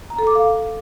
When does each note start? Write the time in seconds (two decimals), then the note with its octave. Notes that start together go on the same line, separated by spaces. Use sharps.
0.10 A#5
0.19 A4
0.27 D6
0.35 F5